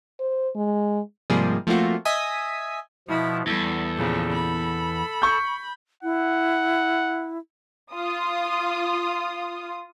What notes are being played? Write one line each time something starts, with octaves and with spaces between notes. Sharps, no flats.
C5
G#3
G#2 C3 F3 G3 A#3 G#4
F3 A3 A#3 C4 F4 F#4
D#5 E5 G#5 D#6 B6
B2 F3 E4
E2 G3 A4
A#2 C#3 F3
B5
C#6 G6
E4 F#5
F4 D#6